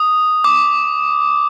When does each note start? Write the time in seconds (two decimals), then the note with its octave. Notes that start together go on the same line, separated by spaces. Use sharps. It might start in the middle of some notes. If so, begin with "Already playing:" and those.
Already playing: D#6
0.44 D6